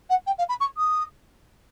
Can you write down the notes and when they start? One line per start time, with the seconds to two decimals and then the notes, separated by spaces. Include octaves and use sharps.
0.10 F#5
0.27 G5
0.38 F5
0.49 B5
0.60 C#6
0.77 D#6